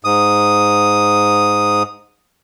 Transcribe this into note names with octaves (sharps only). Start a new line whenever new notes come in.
G#2 D#6